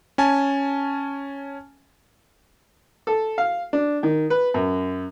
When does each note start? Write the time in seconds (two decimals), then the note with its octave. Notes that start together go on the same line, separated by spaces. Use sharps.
0.18 C#4 G#5 A5
3.07 A4
3.38 F5
3.73 D4
4.03 D#3
4.30 B4
4.54 F#2